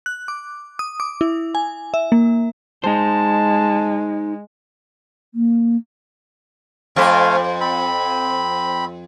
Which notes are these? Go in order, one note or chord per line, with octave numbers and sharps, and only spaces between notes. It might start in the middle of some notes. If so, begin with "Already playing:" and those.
F#6
D6
D#6
D6
E4
G#5
E5
A#3
G#3 D#4 C5 A5
A#3
F2 A3 C5 F5 G#5
C4 B5